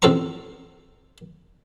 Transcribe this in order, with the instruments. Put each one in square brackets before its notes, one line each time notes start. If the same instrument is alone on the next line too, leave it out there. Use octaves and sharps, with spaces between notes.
[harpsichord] A1 F2 A4 C5 A#5 C#6